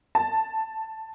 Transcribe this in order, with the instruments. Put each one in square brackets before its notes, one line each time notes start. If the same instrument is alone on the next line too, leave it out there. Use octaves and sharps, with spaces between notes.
[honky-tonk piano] A5